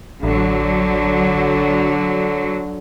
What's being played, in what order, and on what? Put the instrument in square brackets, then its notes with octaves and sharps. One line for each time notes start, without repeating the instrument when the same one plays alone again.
[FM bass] A1 [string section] D3 F#3